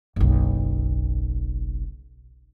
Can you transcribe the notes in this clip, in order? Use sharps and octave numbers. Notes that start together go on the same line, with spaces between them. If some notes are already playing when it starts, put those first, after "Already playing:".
F#1 B1